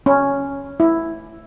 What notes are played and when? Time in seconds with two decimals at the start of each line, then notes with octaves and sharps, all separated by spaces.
0.06 C#4
0.80 E4